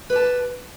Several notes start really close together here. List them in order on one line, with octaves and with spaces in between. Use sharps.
B4 G4 A5